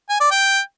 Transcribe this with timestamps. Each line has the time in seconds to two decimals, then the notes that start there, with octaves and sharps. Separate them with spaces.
0.10 G#5
0.20 D5
0.31 G5